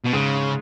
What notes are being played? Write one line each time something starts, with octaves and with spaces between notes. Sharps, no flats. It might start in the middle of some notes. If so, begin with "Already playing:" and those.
B2
G#2 C#3